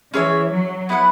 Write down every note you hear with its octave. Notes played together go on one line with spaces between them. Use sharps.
E3 C#4 G#4 C#5 E5
F#3
B3 E4 B4 F#5